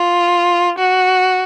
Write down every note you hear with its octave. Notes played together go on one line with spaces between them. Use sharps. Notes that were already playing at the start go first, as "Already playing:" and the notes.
Already playing: F4
F#4